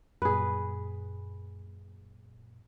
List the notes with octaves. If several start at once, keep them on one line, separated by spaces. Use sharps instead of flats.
F#2 A#2 G#4 B4